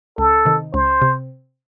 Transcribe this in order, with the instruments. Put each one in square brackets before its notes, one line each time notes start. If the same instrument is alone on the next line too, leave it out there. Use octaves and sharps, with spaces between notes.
[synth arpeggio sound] C#2 [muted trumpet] A4
[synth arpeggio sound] C3 D#3
[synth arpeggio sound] C#2 [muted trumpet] C5
[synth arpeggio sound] C3